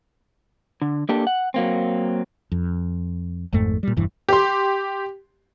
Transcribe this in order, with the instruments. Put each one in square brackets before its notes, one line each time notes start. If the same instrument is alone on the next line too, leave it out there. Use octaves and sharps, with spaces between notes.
[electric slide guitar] D3
A#3 D4 G4 A4
F#5
F#3 A#3 C4
[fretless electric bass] F2
G#1 F2 G#2 A3
A#2 G3
E1 G2 E3
[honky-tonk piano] G4 C6